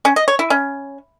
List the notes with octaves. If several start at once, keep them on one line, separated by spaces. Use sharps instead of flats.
C#4
D#5
C#5
E4
C#4